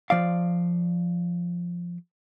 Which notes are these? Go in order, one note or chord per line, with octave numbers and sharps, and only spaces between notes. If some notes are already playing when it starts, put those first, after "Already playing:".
F3 D5 F5